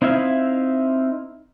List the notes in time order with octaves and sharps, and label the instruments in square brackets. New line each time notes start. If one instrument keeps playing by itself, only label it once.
[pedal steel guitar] C4 D#4 E4 E5 F5